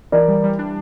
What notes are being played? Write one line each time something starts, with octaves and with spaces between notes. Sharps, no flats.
E3 A#4 D5
G3
G3
D4